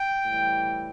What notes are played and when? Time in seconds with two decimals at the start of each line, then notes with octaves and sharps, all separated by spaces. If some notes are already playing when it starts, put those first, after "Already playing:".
Already playing: G5
0.25 A2 E3 G3